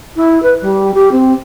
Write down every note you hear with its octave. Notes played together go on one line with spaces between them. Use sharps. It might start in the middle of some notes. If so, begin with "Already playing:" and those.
E4
B4
G3
G4
C4